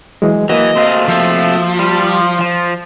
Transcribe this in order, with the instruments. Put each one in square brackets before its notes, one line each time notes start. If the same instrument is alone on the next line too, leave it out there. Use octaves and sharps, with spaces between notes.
[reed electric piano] E3 F#3 G#3
[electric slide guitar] E3 [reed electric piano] A#3 F#4 [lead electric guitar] D#5
[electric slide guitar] C3 A3 F5 [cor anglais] C4
[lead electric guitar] F3 [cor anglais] E5
[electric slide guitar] G3 [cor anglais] F4
[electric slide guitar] F3